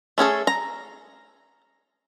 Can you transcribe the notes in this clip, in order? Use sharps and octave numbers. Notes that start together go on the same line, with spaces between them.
A3 C#4 G#4 A4
A#5